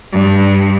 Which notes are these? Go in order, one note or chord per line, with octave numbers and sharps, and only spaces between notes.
G2